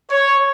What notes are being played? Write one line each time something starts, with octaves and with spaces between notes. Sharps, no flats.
C#5